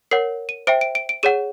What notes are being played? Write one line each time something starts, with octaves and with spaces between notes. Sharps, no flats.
A#4 C#5 F#5 C7
D#7
C5 E5 G5 D7
D7
D7
D7
G#4 C#5 F#5 D#7